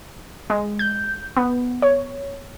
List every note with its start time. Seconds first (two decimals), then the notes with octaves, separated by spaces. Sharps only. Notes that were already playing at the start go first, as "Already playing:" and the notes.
0.50 G#3
0.79 G6
1.37 B3
1.82 C#5